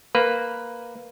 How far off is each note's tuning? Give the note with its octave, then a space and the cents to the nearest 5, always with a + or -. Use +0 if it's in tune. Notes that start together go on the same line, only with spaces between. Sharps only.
A#3 +0 B4 +5